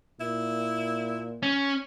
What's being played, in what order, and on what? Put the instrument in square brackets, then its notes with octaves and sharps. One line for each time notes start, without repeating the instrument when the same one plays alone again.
[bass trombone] A#2 [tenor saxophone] E4
[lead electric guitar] C#4